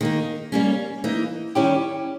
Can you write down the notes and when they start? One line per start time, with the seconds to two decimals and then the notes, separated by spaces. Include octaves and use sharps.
0.01 D#3 A#3 D#4
0.52 G3 A#3 C#4
1.04 E3 A#3 D#4
1.55 D#3 G3 C#4 E4 G4